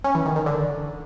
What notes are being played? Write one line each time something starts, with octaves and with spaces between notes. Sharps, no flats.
C#4
E3
D#3
D#3
D3